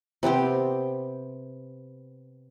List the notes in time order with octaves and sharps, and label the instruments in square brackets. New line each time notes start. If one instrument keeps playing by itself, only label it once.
[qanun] C3 B3 C4 G4